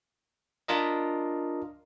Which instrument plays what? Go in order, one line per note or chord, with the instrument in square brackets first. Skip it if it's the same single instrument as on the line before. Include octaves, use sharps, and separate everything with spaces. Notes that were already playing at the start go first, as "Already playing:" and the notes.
[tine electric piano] D4 F4 A#4 D#5